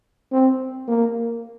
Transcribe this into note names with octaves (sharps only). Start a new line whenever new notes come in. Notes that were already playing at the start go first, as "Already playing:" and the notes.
C4
A#3